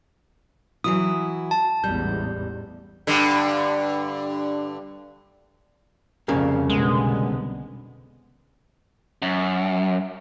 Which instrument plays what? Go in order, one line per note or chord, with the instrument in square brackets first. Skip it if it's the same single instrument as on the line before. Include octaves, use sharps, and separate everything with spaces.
[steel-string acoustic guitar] E3 F#3 E4 [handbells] D#6
[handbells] A5
[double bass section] A1 E2 G#2 [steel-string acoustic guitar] G3 [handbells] G6
[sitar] G2 D3
[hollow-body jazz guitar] C2 C#3 A#3 [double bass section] F2
[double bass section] B1 D3 B3 [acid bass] G#3
[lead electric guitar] F#2